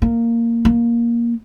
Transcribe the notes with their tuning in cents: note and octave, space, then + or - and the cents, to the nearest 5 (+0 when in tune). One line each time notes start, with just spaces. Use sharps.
A#3 -10
A#3 +10